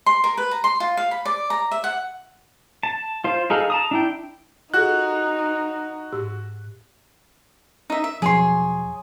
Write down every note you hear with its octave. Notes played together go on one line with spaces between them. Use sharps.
C6
A#4
B4
A#5
C6
F4
F5
B5
D5
A#5
E5
F#5
A5
F4 C5
D#4 G#4 A4 F5
A5 A#5 D#6
D4 E4 G5
D#4 F4 F#4 G#4 A4 F#6
G#2 G4 E6
D#4 E5
E5
E1 F3 F#3 G#4 C#5 C6